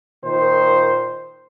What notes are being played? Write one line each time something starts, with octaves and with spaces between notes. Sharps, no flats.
A#2 D#3 C5